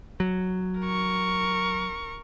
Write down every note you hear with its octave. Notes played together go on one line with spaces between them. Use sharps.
F#3
A#4 C#6